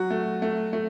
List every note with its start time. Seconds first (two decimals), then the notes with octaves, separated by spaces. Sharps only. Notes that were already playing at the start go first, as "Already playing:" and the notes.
Already playing: F#3 F#4
0.10 A3
0.42 A3
0.73 A3